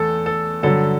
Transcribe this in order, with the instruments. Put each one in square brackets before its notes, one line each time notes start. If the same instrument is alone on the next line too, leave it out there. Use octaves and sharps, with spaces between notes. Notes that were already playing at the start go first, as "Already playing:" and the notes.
Already playing: [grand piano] E2 A3 A4
A4
G2 D3 F#3 A4